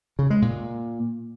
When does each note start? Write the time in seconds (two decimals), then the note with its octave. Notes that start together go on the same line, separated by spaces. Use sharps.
0.19 C#3
0.30 G#3
0.42 A#2